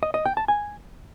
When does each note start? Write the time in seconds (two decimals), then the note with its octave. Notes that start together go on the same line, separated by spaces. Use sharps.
0.03 D#5
0.14 D#5
0.25 G5
0.37 A5
0.48 G#5